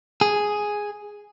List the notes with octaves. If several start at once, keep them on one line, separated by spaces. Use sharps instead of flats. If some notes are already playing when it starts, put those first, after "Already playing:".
G#4